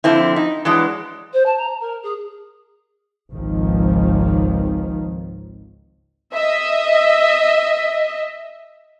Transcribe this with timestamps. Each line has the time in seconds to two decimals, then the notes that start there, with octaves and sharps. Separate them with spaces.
0.04 D3 F3 C4 E4
0.36 D#4
0.65 E3 F#3 G#3 D4
1.33 C5
1.46 A5
1.58 A#5
1.81 A#4
2.03 G#4
3.30 G#1 C#2 D#3 F3
6.33 D#5 E5